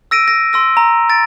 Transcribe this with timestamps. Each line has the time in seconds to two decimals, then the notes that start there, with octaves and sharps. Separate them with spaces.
0.11 E6 A#6 D7 D#7
0.28 A#6
0.53 C6 E6 A#6
0.77 A#5
1.10 A6 D7